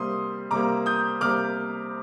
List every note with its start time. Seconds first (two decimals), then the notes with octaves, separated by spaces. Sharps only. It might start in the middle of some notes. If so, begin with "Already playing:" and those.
Already playing: C3 G3 A#3 C6 D#6
0.51 C3 G3 A#3 A#5 D6
0.86 D#6 G6
1.21 C3 G3 A#3 D6 F6